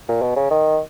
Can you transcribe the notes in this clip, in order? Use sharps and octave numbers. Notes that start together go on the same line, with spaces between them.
A#2
B2
C#3
D#3